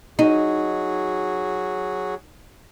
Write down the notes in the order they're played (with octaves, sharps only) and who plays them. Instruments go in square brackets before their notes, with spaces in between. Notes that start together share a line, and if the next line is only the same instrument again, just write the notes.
[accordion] F#3 F#4 G#4 [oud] D#4